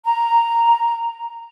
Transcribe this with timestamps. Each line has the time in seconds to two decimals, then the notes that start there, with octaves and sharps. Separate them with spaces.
0.03 A#5